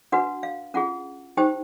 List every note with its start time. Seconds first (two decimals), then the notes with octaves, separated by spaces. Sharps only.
0.12 D4 F#4 B4 F#5
0.43 F5
0.74 C#4 F4 G#4 F#5
1.37 D#4 G4 C5 G5